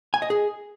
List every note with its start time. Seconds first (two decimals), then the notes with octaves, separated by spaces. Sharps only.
0.14 G#5
0.22 D#5
0.30 G#4